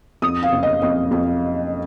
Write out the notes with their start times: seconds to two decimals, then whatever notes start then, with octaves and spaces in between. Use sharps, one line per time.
0.22 F2 D#6
0.43 F5
0.53 F#1
0.63 D#5
0.82 F2 D#5
1.11 F2